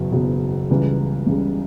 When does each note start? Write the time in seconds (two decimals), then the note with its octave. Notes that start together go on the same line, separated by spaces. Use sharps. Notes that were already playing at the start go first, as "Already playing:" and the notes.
Already playing: F#1 E2 B2 F#3
0.13 F#1 E2 B2 F#3
0.70 C#2 C#3 E3 G3
1.27 C#2 C#3 E3 G3